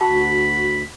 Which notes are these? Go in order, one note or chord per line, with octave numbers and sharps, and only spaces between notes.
D2 F#4 A5 B5